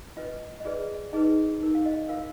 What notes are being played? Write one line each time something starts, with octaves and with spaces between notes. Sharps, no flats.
F4 B4 D#5
D#5
F4 G#4 B4 D5
D#4 G#4 B4 D#5
D#4 A#4
F5
D#5
F4 A#4 F5